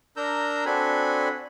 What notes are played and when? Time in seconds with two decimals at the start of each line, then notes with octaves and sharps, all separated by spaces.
0.17 D4 A#4 A#5 E6 G6
0.66 C4 D4 F#4 A4 G#5 B5